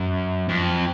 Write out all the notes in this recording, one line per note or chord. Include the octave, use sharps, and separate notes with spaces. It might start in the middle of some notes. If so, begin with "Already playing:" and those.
Already playing: F#2
F2